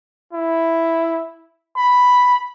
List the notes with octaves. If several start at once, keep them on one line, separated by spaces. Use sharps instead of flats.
E4
B5